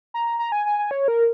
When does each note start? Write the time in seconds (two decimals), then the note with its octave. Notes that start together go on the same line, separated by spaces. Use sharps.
0.14 A#5
0.39 A#5
0.52 G#5
0.66 G#5
0.79 G#5
0.91 C#5
1.08 A#4